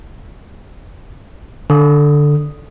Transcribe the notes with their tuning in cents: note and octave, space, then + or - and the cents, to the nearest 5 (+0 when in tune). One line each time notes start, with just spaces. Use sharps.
D3 +0 D#6 +0